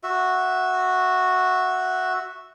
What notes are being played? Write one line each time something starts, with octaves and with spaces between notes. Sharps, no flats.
F#4 E5